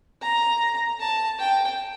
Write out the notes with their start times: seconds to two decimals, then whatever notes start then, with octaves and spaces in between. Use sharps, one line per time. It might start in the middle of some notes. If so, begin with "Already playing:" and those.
0.21 A#5
0.99 A5
1.39 G5